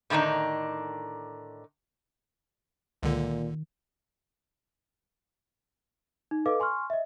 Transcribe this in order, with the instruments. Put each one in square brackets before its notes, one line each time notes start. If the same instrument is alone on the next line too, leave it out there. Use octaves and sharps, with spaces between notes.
[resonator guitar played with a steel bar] A2 D3 D#3 D4 D#4
[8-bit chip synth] C#2 D3 [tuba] A#2 [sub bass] D#3
[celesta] D#4
A4 B4 D#5 F5 D6
G#5 C6 C#6 F6
D#5 E5